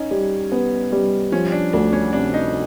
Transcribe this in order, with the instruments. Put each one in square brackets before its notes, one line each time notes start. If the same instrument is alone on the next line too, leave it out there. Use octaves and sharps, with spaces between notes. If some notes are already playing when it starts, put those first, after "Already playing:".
Already playing: [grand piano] C#4 [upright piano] D#4
[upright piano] G3
B3
G3
[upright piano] F3 [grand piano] C#4
[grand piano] D4
[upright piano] D2 [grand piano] D4
[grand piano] C#4
[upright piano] C3 [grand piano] D4
[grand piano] D#4